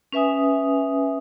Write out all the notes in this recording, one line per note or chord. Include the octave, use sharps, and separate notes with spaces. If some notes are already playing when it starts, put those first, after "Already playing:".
C#4 B4 E5 G#5 D#6